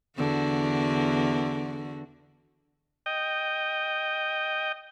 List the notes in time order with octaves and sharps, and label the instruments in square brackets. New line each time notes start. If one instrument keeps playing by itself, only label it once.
[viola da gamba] E2 D3 F#4
[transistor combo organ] D#5 G5